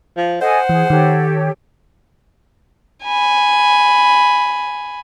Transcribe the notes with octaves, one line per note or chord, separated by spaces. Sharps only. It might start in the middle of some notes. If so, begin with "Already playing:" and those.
F3
A4 C5 D#5 F#5 G#5
E3 G#4
D#3 G4 A4 C#5
G#5 B5